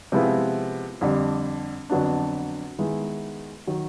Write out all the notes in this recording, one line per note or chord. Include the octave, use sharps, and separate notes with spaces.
C3 F3 G#3 B3 E4
F2 D3 G3
F2 D3 F#3 B3 D4
D#3 G#3 B3 E4
D#3 F#3